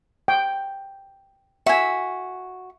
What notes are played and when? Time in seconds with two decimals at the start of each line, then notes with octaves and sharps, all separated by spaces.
0.28 G5
1.66 F#4 E5 G#5